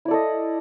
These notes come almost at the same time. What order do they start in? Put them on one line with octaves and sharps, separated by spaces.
E4 D5 A4 D#5